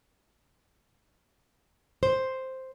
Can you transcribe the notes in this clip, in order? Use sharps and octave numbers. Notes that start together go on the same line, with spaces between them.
C5